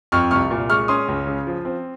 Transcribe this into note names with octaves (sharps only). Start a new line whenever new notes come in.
F2 C#6 F6
C2 C#6 F6
A#2
G#3 C#6 F6
C#4 C6 D#6
C#2
C#3
F3
C4